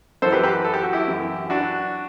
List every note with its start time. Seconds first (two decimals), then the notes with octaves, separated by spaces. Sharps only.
0.22 F#2 E3 A4 C5
0.33 G4 B4
0.43 G4 B4
0.64 A4
0.74 G4
0.83 F#4
0.93 E4 G4
1.08 F#2 E3
1.50 D4 F#4